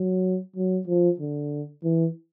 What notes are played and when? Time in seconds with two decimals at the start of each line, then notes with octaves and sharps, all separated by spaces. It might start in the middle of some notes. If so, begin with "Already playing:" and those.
Already playing: F#3
0.56 F#3
0.87 F3
1.19 D3
1.83 E3